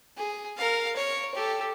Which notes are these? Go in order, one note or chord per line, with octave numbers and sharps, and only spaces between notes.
G#4
A#4 F5
C#5
G4 A4